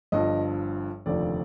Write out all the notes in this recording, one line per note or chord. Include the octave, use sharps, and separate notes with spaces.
G1 G2 F3 D#5
F1 D#2 D3 F3 D5